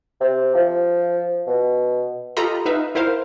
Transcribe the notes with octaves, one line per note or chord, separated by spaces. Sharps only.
C3
F3
B2
F4 G4 A4 D#5 A#5 B5
D#4 B4 E5 F5
E4 A#4 C5 F5